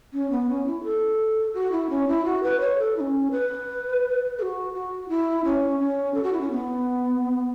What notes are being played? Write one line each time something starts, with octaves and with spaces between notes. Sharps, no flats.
C#4
B3
C#4
E4
A4
F#4
E4
C#4
E4
F#4
B4
C#5
A4
E4
C#4
B4
A4
F#4
F#4
E4
C#4
C#4
A4
F#4
E4
C#4
B3